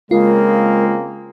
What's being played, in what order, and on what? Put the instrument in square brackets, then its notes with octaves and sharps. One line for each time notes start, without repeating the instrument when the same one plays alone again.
[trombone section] C#3 A#3 C4 [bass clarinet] G#3 [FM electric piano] F4 [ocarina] A#4